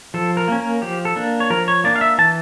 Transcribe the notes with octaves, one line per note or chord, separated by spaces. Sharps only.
F3 A4
A#4
A#3 C#4
A#4
F3 G4
A4
A#3 D4
C#5
F3 A#4
C#5
A#3 D4 D5
F5
E5
E3 A5